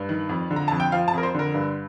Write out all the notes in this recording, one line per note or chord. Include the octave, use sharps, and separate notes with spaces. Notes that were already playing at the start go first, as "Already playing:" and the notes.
Already playing: G2
D#3
F2
D3
A#5
F2 A5
G5
F3 F5
A5
F2 A#4
C5
D3 A#4
G2